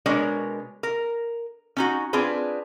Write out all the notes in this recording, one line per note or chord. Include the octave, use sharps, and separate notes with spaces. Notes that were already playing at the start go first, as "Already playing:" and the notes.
B2 G#3 D4 A#4 C#5
A#4
C#4 D#4 F#4
C4 D4 F4 G#4 B4